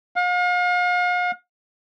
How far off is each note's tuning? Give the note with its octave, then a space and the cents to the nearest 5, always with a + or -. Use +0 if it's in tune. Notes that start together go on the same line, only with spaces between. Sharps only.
F5 +40